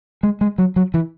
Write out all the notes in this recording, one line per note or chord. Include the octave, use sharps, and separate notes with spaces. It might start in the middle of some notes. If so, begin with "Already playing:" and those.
G#3
G#3
F#3
F#3
E3